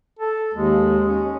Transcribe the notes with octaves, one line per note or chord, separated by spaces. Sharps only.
A4
D#2 G#3
C#4